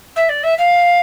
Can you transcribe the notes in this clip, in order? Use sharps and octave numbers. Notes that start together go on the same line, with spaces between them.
E5
D5
E5
F5